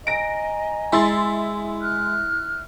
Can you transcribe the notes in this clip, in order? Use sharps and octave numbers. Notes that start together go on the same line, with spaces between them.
D#5 G#5 A#5 A#6 D7
G#3 E4 C6 A6
F6 F#6